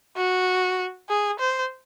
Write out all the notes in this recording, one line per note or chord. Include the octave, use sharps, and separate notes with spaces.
F#4
G#4
C5